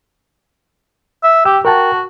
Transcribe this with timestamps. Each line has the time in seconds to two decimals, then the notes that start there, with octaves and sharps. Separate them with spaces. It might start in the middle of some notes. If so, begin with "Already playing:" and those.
1.23 E5
1.45 G4 G5 E6
1.65 F#4 A#4 G5 A5